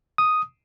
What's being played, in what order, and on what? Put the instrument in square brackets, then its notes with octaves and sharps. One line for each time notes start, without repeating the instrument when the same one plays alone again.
[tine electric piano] D#6